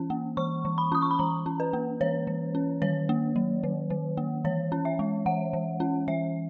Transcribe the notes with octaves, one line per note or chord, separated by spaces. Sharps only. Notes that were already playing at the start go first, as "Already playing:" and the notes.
Already playing: E3 C#4
A#3
E3 C#6
E3
B5
C#4 D#6
C#6
B5
E3 A#5
C#4
B4
A#3
E3 C#5
E3
C#4
D#3 C#5
A#3
F#3
D#3
D#3
A#3
E3 C#5
C#4
E5
G#3
E3 F#5
E3
C#4
E3 E5